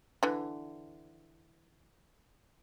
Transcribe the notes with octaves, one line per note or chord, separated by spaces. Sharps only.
D3 E3